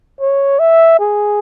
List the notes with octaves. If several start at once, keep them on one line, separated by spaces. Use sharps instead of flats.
C#5
E5
G#4